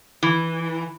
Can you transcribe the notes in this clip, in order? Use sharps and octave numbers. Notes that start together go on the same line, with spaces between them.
E3